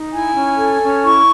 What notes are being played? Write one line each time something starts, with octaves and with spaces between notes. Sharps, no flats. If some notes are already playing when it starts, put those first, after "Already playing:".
Already playing: D#4
E4 G#5
C#4
A4
C#4
E4 C#6